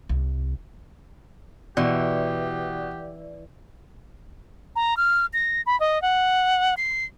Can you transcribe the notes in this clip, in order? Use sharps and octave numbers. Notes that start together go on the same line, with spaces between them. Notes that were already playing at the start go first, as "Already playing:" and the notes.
C2
B2 E3 G4 D5
A#5
F6
A#6
B5
D#5
F#5
C7